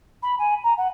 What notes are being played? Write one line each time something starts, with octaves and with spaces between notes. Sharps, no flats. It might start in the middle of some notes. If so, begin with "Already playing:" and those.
B5
G#5
A#5
F#5